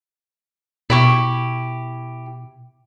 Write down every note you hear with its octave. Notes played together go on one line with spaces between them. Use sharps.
B2 E4 G4 C#6